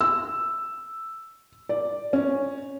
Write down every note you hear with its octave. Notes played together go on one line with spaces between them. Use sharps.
E6
D5
C#4